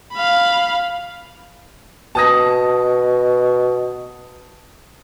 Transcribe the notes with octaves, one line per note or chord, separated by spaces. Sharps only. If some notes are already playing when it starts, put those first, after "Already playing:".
F5 B5
B2 A5 D#6 A#6